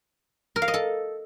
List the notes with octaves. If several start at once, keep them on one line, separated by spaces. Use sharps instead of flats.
A#4
F5
D#5
A4